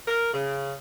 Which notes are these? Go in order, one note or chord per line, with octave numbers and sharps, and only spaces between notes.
A#4
C#3